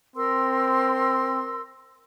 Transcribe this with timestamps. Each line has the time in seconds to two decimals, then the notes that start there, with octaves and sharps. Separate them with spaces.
0.16 C4 A#4 C6 E6